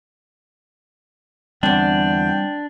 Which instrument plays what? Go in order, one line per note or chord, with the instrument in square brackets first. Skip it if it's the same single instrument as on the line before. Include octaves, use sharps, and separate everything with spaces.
[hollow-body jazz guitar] E2 D3 [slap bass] G3 C4 [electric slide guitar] D4 [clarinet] G5